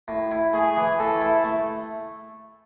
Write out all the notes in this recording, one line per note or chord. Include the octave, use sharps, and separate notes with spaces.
A2
E4
A3 G#4
E3
A2 A4
E4
A3